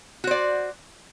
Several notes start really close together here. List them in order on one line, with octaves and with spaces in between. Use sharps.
F#4 C5 D5